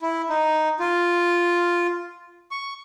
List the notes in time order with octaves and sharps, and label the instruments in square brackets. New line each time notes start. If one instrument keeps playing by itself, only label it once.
[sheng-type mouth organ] E4
D#4
F4
C#6